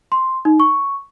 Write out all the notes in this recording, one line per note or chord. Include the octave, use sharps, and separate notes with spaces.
C6
D#4
C#6